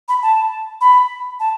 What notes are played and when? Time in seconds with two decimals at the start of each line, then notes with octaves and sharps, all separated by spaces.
0.09 B5
0.22 A5
0.81 B5
1.40 A5